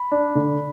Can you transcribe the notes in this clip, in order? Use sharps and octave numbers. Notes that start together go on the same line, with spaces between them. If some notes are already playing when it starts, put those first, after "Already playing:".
Already playing: B5
D4
D3